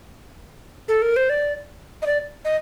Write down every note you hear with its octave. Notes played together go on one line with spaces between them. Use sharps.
A4
A#4
C5
D5
D#5
D5
D#5